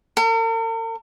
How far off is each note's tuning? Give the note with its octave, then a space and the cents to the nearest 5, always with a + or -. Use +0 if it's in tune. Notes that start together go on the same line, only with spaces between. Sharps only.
A#4 -45